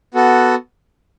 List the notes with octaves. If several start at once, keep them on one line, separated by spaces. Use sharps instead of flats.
B3 F#4 A4